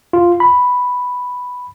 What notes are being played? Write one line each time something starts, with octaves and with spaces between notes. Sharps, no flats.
F4
B5